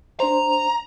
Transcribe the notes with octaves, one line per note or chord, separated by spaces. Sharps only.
D4 C5 A#5